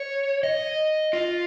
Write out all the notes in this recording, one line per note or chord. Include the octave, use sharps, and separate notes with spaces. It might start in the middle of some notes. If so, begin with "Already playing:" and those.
Already playing: C#5
D#5
F4